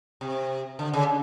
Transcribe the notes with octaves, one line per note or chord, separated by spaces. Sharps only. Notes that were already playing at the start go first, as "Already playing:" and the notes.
C3
D3
C#3